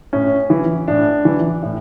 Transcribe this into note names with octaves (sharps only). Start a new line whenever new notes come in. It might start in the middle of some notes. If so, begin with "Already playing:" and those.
A2 C#4
E3
A2 D4
E3
A2